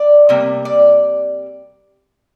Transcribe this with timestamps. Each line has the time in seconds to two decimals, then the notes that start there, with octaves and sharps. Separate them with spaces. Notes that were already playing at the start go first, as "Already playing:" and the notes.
Already playing: D5
0.29 C3 G3 A#3
0.65 D5